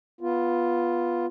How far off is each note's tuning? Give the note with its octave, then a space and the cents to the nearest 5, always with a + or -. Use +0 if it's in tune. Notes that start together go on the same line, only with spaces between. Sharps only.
B3 -10 F4 +0